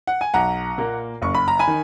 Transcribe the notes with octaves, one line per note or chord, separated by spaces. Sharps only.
F#5
G#5
B1 F#5 A#5
A#2 A#3
F#1 C#6
B5
A#5
G#5 B5
D#3